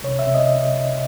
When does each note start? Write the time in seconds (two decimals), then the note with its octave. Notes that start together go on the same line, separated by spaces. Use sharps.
0.04 C3 C#5
0.19 E5
0.27 C3
0.34 D#5